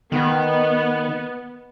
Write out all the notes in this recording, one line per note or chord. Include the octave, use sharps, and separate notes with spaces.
D#3 B3